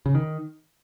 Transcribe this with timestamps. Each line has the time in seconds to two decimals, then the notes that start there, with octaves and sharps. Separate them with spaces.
0.06 C#3
0.15 D#3